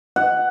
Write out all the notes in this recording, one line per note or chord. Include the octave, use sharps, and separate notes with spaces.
F#5